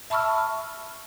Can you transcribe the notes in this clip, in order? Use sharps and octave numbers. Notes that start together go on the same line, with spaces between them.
E5 A5 B5 C#6 E6 F6